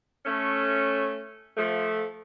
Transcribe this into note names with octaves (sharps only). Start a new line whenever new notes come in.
A3 C#4
F3 A3